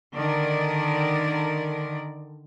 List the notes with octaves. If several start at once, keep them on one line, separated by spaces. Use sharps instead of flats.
D3 D#3 A#4 D5